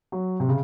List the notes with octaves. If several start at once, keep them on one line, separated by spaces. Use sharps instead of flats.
F#3
C3
C#3